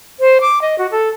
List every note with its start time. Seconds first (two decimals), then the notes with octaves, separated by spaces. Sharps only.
0.20 C5
0.41 D6
0.62 D#5
0.78 F#4
0.91 A4